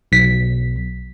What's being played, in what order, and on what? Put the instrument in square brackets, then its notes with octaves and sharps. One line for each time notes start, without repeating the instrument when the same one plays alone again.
[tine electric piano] B1 B6